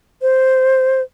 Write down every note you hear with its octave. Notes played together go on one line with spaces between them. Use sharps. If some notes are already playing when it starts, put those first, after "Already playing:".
C5